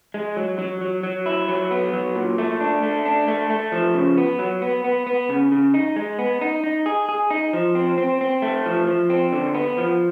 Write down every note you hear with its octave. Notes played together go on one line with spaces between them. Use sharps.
G#3
F#3
F#3
F#3
F#3
E4
F#3
B3
F#3
A#2
A3
D4
A3
D4
A3
A3
F3
C#3
B3
F#3
B3
B3
B3
C#3
C#3
D#4
G#3
B3
D#4
D#4
G#4
G#4
D#4
F3
C4
C4
C4
A3
F3
F3
C4
D3
B3
F3